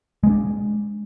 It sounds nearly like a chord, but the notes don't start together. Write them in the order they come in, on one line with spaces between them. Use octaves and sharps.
G#3 B3 D4